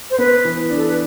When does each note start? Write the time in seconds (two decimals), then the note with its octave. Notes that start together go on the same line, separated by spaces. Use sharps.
0.10 C5
0.18 B3 B4
0.45 E3
0.70 D4
0.76 A4
0.86 B4